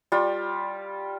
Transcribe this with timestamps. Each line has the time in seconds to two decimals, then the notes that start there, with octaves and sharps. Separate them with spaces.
0.12 G3 F4